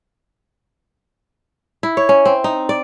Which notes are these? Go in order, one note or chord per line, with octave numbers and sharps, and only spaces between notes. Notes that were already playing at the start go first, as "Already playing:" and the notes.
E4
C#5
C#4
C4
D#4
D5